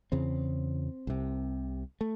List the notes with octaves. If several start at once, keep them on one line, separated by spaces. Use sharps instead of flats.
E2 C#3 C4
C2 C3
A3